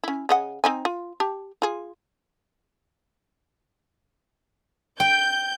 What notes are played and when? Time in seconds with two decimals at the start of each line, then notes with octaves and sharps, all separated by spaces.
0.04 C#4 E4
0.29 C#3 D#5 F#5
0.64 C4 D#4 G#5
0.85 F4
1.20 G4 A5
1.62 F4 G#4
5.00 G5 G6